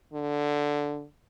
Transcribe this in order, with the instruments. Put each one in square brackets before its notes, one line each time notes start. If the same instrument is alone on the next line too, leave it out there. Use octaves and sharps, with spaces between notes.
[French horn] D3